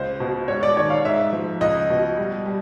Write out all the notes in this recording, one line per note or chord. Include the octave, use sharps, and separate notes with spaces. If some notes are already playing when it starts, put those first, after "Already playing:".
Already playing: C#2 C5
B2
G#2 C#5
D5
D#3 C#5
F5
G#2 E5
F3
C#2 D#5
B2
G3
G3